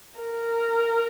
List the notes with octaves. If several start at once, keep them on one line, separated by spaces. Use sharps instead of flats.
A#4